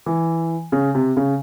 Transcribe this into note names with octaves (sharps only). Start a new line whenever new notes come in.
E3
C#3
C3
C#3